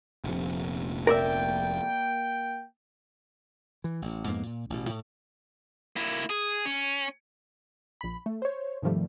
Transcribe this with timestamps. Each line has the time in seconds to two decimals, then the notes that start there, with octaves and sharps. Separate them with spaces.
0.24 F1 A#1 C3
1.07 A#3 A#4 D5 E5 G5
3.84 E3
4.02 A1
4.27 F2 G#2 A#3 B3
4.47 A#2
4.70 A1 B2
4.89 A2
5.96 A#3 E4
6.30 G#4
6.66 C#4
8.01 A#1 B5
8.26 A3
8.42 C5 C#5
8.82 G#2 C3 D#3 F3 G3 A3